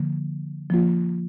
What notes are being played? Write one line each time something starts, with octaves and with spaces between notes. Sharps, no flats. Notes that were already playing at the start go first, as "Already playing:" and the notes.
Already playing: D3 F3 A#3
F3 A#3 F4